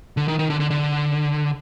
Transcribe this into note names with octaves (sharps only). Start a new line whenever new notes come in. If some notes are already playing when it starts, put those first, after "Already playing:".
D3
D#3
D#3
D3
D3
D3